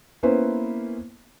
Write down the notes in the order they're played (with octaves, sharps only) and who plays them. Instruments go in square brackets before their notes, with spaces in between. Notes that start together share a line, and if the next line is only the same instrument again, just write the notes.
[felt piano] A#3 B3 C#4 E4 B4 C5